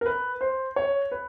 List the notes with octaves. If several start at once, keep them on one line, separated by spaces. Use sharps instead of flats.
A#4
B4
C5
C#5
B4